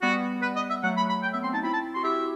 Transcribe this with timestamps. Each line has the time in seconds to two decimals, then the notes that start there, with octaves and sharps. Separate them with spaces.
0.02 G3 B3 F#4
0.42 B4
0.56 D#5
0.70 E5
0.83 F#3 A3 F#5
0.97 B5
1.09 B5
1.23 G5
1.33 B3 E5
1.43 C4 C6
1.53 D#4 A5
1.63 C4 E4 B5
1.73 A5
1.94 F#4 C6
2.04 E4 G4 E5